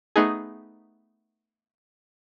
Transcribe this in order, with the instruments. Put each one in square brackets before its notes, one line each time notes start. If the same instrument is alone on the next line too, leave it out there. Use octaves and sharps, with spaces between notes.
[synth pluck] A3 B3 D#4 G#4